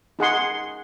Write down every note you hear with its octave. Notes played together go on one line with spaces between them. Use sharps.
D#4 G#4 F#5 C6